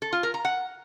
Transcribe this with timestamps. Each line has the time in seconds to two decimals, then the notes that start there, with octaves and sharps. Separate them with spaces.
0.02 A4
0.13 F4
0.23 A#4
0.34 A#5
0.45 F#5